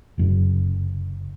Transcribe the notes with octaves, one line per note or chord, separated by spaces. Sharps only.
F1 F#2 C#3